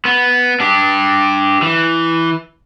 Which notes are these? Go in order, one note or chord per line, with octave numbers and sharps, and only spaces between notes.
B3
D4 G4
E3